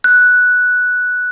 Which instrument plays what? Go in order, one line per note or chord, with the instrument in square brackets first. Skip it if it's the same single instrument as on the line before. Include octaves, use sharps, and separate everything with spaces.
[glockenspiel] F#6